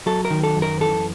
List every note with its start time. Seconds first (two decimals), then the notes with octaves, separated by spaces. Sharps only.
0.06 F#3 A4
0.25 A#4
0.31 D#3
0.43 A4
0.56 F#2
0.62 A#4
0.80 E3 A4